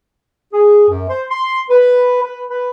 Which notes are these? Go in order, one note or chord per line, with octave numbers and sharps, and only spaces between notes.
G#4
F#2
C5
C6
B4
B4
B4